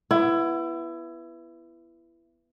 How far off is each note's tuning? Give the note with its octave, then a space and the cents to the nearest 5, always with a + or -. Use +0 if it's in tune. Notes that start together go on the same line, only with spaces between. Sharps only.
B3 +0 E4 +25